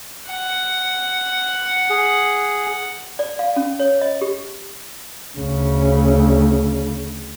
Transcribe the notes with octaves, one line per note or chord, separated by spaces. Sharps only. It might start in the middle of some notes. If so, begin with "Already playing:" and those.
F#5
G#4
D5
F5
C#4
C#5
D#5
G4
D2 C#3